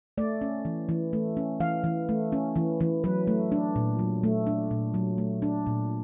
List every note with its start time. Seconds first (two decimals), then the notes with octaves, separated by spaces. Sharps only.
0.18 A3 D5
0.41 C#4
0.65 E3
0.89 E3
1.13 A3
1.37 C#4
1.60 E3 F5
1.84 E3
2.09 A3
2.32 C#4
2.56 E3
2.81 E3
3.04 F#3 B4
3.27 A3
3.52 D4
3.76 A#2
3.99 F#3
4.23 A3
4.47 D4
4.71 A#2
4.94 F#3
5.18 A3
5.42 D4
5.67 A#2